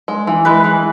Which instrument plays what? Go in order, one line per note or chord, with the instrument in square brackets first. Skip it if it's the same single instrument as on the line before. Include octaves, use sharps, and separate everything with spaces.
[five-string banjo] G#3
E3
[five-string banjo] G#3 [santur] B4
[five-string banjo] E3